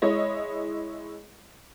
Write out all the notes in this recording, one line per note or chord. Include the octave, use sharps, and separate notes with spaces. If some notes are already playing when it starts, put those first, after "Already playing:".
G#3 E4 C#5 D#5